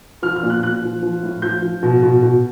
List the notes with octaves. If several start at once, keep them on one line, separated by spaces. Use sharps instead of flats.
F3 F6
F6
A#2
F#6
A#2 F#6
F3
F3
A2
F3 G6
F3
B2
B2
B2